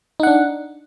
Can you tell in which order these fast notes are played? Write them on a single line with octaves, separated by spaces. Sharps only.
D#4 F#5 D4